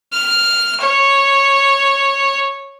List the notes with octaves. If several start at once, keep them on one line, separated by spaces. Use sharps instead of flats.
F6
C#5